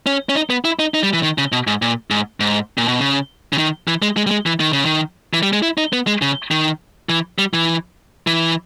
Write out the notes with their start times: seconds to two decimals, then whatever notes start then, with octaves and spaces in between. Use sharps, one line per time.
0.06 C#4
0.29 C#4
0.35 D#4
0.50 B3
0.65 E4
0.79 D#4
0.94 D#4
1.03 G3
1.13 E3
1.23 D#3
1.38 C#3
1.52 B2
1.67 G#2
1.82 A#2
2.11 G#2
2.40 G#2
2.78 A#2
2.88 B2
3.00 C#3
3.53 C#3
3.58 D#3
3.88 E3
4.02 G#3
4.17 G#3
4.27 G3
4.31 G#3
4.46 E3
4.60 D#3
4.73 C#3
4.85 D#3
5.34 E3
5.43 G3
5.53 G#3
5.62 E4
5.78 D#4
5.93 B3
6.07 G#3
6.22 C#3
6.51 D#3
7.09 E3
7.39 G3
7.53 E3
8.27 E3